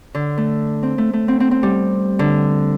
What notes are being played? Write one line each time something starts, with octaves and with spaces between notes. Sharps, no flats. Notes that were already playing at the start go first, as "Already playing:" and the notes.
D3
A3
C4
A3
A3
C4
C4
C4
G3
D3